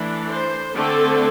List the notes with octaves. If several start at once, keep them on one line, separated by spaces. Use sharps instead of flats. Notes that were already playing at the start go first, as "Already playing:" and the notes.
Already playing: E3 A3 D4
C5
D3 A3 C4 A4